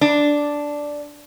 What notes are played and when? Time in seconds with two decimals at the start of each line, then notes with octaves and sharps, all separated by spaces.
0.01 D4